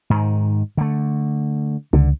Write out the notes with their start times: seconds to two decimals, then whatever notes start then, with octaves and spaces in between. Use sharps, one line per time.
0.10 G#2 D#3
0.77 D3 A3
1.93 C#2 D3